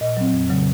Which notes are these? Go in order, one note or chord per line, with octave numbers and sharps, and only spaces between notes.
A#2 D#5
F#3 C4
F2
C#3 F#3